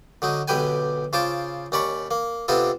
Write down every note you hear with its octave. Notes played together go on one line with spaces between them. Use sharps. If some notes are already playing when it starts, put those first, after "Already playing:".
D3 F#3 D#4
B1 D3 G4 B4 G5 G#5
C#3 F4 C5 A5 D6
D#2 C#4 D5 B5 C#6
A#3
C3 B3 C4 D4 F4 A4